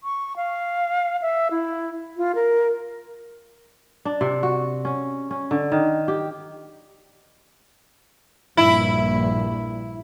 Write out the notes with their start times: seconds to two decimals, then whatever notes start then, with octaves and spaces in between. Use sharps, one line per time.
0.04 C#6
0.36 F5
1.22 E5
1.51 E4
2.17 F4
2.35 A#4
4.05 D4
4.21 C3
4.43 F#4
4.85 C#4
5.31 C#4
5.51 D3
5.72 D#3
6.08 G4
8.57 A#1 G2 E4